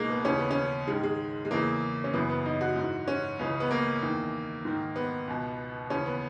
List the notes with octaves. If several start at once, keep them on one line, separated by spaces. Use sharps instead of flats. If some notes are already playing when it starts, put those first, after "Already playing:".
Already playing: C#2 B2 G#3 A#3 D#4
B3
D#2 C#3 E3 C#4
B3
C#4
G#2 D#3 G#3
G#3
G#3
E2 C#3 E3 A#3
C#4
F#2 C#3 E3 B3
B3
D#4
F#4
G#2 E3
C#4
C#2 C#3 E3
B3
A#3
E2 D#3
G#2 D#3
B3
C#2 B2
D#2 C#3 E3 C#4
B3